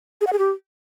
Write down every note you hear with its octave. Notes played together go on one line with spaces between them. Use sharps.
G#4
F#5
G#4
G4